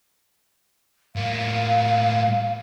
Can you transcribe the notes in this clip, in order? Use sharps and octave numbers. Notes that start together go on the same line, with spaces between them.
A2 A#3 F5